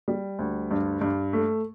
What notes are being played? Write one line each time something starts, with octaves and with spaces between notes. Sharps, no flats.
G3
D2
G2
G2
A3